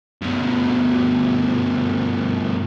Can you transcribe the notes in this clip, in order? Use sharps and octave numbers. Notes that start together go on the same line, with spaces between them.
G2 B2